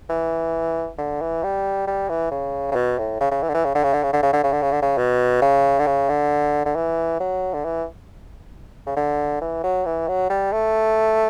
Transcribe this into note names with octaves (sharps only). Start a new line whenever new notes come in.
E3
D3
E3
G3
G3
E3
C#3
C#3
B2
A2
C#3
C#3
E3
D3
E3
C#3
D3
C#3
D3
C#3
D3
C#3
D3
C#3
D3
C#3
D3
C#3
B2
C#3
D3
C#3
D3
D3
E3
F#3
D3
E3
C#3
D3
E3
F#3
E3
F#3
G3
A3